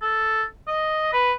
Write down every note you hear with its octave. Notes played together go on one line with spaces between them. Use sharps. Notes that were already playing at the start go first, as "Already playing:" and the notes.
A4
D#5
B4